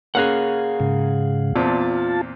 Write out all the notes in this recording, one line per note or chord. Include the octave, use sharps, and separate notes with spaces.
A#3 C#4 G#4 F5 F#5 F#6
G#2 C#3
E2 A#2 C4 F4 A5